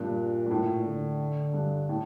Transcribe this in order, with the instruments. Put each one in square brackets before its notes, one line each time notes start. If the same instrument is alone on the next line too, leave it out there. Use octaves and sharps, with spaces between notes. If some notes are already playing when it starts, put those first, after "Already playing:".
Already playing: [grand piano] G2 [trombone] A#2
[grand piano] G2
A2
[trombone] D3
[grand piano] G2
A2